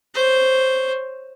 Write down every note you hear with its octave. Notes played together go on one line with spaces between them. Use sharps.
C5 C#5